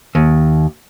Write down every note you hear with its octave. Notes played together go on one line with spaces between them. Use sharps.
D#2